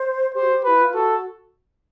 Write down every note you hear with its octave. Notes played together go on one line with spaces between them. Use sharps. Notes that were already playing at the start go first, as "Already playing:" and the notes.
Already playing: C5
G4 C5
F#4
G4
E4 B4
F4
F#4 A4